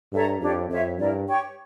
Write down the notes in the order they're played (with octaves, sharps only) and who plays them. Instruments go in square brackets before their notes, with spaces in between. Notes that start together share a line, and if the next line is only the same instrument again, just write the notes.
[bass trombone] G2 [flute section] A4 C#5 E5 A#5
[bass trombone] F2 [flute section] D4 G4 C#5
[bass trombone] F2 [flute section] F4 C#5 E5
[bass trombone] G2 [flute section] E4 A#4 D5
[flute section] G4 C#5 G5 C#6